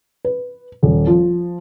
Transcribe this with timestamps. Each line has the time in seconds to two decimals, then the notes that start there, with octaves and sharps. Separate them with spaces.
0.25 B4
0.83 D#1
1.07 F3